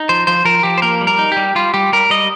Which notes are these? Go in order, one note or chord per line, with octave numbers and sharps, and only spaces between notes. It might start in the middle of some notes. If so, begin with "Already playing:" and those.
Already playing: D#4
F3 C5
F3 C5
F3 A#4
F3 G4
C5
A#3 A#4
G3
A#4
D#4
G3 G4
G3 F4
G3 G4
G3 A#4
G3 D#5